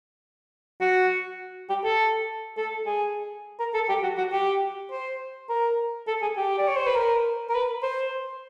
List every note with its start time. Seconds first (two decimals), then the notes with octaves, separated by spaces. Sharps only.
0.81 F#4
1.69 G4
1.84 A4
2.57 A4
2.86 G#4
3.59 A#4
3.74 A4
3.89 G4
4.03 F#4
4.18 F#4
4.32 G4
4.91 C5
5.49 A#4
6.07 A4
6.22 G#4
6.37 G4
6.58 D5
6.68 C#5
6.76 C5
6.86 B4
6.95 A#4
7.49 A#4
7.54 B4
7.82 C5